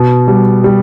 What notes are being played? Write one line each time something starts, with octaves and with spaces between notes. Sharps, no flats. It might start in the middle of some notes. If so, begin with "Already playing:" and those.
Already playing: B2
G3
G3